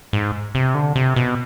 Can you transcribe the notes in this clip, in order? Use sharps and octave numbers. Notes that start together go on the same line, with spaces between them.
G#2
C3
D3
C3
B2